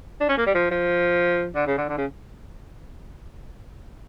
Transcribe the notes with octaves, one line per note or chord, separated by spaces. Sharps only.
D4
C#4
A#3
G3
F3
F3
D3
C#3
D3
D3
C#3